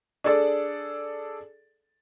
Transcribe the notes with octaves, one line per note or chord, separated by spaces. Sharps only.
D4 G#4 A4 D5